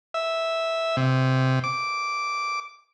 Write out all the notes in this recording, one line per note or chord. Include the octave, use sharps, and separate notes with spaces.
E5
C3
D6